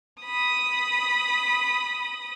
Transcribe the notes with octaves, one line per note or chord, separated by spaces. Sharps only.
B5 D#6